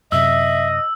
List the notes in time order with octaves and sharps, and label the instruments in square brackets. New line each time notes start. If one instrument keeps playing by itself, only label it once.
[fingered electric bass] F#2 C3 [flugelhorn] D#5 [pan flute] E5 [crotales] E6